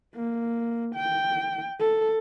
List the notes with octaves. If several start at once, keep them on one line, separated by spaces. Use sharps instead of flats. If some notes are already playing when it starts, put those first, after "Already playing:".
A#3
G5
A4